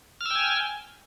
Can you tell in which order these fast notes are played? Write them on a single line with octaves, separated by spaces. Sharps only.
F6 E6 G5 G#5